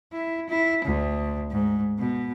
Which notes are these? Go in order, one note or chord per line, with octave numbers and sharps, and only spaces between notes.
E4
E4
D2
G#2
B2